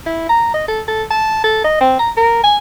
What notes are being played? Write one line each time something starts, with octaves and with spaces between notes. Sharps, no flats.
E4
A#5
D#5
A4
A4
A5
A4
D#5
C4
A#5
A#4
G#5